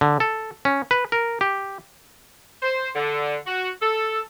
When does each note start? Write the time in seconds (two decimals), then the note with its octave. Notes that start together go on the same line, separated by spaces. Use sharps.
0.01 D3
0.20 A4
0.65 C#4
0.91 B4
1.12 A#4
1.41 G4
2.61 C5
2.95 D3
3.46 F#4
3.82 A4